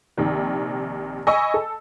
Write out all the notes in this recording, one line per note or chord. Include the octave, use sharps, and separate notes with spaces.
A#1 C3 D#3
D#5 G#5 B5 C#6 E6
A4